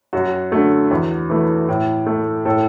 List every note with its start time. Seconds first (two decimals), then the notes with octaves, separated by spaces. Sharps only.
0.13 F#2 F#4
0.51 D3 A3 F#4
0.91 E2
1.30 E3 A3
1.69 A2
2.06 A3
2.45 A2 A4